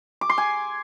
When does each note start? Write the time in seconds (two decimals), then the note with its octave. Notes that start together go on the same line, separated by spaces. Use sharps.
0.21 D6
0.30 C6
0.38 G#5